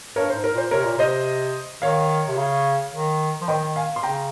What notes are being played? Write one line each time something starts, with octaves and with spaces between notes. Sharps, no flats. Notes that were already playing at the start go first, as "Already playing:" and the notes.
G2 A#4 C#5
C5
G#2
A#4
A#2 C5
C3 A#4 C#5
A#2
C3 C5 D#5
D#3 C#5 F5
C3
C#3
D#3
F3
D#3 D#5 G5
F5 G#5
C6
C#3 G5 A#5